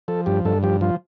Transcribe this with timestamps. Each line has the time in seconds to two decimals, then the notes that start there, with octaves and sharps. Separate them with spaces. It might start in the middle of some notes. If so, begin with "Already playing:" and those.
0.08 F3 A4
0.26 G2 G4
0.45 G2 A4
0.63 F3 G4
0.81 F3 F4